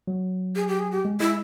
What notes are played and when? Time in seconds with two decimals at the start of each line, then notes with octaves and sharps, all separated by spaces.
0.07 F#3
0.56 G#4
0.68 G4
0.79 G#4
0.92 G4
1.05 G#3
1.20 G#3 E4